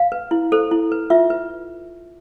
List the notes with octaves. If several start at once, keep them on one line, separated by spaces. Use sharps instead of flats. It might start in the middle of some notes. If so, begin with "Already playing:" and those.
Already playing: F5
B4
E4
A4 C5
E4
B4
F4 E5
B4